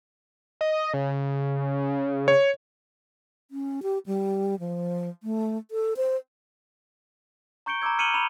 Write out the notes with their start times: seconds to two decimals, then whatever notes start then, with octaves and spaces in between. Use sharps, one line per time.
0.61 D#5
0.94 C#3
2.28 C#5
3.51 C#4
3.83 G4
4.06 G3
4.59 F3
5.23 A3
5.71 A4
5.97 C5
7.66 A#5 C#6 G6 C#7 D7 G7
7.82 A#5 B5 D6 E6 G#6
7.99 F6 C#7 D#7 E7 F#7 G7
8.14 B5 F7